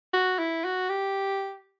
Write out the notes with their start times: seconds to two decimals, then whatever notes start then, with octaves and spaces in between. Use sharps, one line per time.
0.13 F#4
0.39 E4
0.65 F#4
0.89 G4